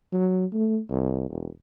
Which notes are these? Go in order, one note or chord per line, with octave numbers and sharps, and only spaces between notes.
F#3
A3
C2
E1